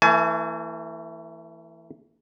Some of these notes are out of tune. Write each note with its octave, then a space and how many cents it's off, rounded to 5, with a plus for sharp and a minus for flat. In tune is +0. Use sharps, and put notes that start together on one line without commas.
E3 +0 A3 +40 G#5 +40